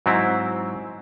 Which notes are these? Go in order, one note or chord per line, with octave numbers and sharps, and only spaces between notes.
G#2 F#3 C4 E4